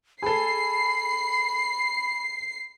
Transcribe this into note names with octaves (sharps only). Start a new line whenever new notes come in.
G#4 A4 B5 C7